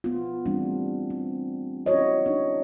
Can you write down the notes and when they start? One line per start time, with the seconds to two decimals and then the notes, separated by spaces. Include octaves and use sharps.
0.04 B3 F4
0.45 E3 G3 A3 C4 D4 F4
1.10 C4
1.86 C#4 E4 F#4 C#5 D#5
2.26 D4 D#4